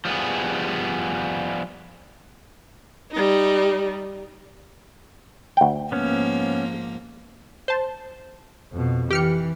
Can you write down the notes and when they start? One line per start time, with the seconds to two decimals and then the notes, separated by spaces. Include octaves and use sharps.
0.05 F3 G3 B3 G#4
3.12 G3 D#4
5.57 D2 G5
5.92 G#2 F3 A#3 B3 C#4
7.68 C5 A5
8.73 F2 B2
9.11 E3 G4 F6 C#7